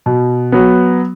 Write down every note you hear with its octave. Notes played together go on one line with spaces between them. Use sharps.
B2
F#3 B3